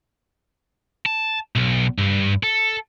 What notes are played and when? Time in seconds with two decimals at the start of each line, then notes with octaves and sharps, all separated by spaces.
1.06 A5
1.56 B1
1.98 G2
2.43 A4